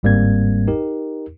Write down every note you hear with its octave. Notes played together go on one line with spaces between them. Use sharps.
G1 G#2 G3 A#3 C4 G#6
D#4 G4 A#4